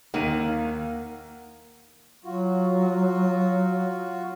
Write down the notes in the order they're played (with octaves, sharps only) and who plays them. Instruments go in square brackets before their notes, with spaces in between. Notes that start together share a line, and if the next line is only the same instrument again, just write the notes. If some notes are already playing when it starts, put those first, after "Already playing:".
[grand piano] D#2 D#7 [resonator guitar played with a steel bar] D#3 [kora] A#3 [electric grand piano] F5 F#5
[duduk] F#3 [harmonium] F4 F#4